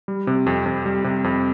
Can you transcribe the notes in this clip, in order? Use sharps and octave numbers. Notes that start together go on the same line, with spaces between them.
G3
C3
F2
F2
G3
C3
F2